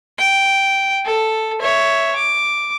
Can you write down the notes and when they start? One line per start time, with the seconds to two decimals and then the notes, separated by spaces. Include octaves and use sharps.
0.18 G5
1.05 A4
1.60 C#5 E5
2.16 D6